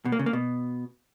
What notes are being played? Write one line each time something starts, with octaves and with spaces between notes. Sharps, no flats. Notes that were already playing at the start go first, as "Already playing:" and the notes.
B2
A#3
C#3
A#3
B2